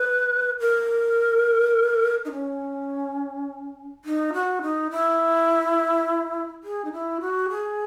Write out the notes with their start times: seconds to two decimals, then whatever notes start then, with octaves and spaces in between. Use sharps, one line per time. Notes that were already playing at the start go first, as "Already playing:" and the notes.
Already playing: B4
0.60 A#4
2.25 D#4
2.32 C#4
4.05 D#4
4.33 F#4
4.62 D#4
4.91 E4
6.64 G#4
6.85 D#4
6.93 E4
7.21 F#4
7.50 G#4